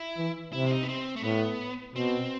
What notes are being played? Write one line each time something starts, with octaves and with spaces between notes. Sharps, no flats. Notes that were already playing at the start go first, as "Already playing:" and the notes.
Already playing: E4
E3
C3 E4
C4
D#4
B3
C4
A3
A2 B3
B2 C4